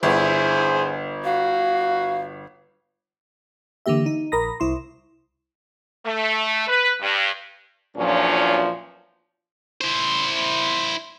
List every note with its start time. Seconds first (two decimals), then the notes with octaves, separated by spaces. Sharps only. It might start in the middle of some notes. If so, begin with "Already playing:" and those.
0.03 G1 E4 G#4 C5
1.24 F#4 F5
3.86 D3 E3 A#3 G4 E5
4.06 D#4
4.32 A#1 A#4 A#5 B5 D#6 A#6
4.60 C2 E4 C6
6.04 A3
6.67 B4
7.01 G2
7.97 E2 A#2 F3 F#3 C#4 D4
9.81 E4 C5